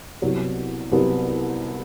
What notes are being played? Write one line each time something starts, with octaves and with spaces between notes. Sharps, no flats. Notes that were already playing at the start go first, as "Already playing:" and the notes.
C2 C3 F#3 B3
C2 C3 F#3 B3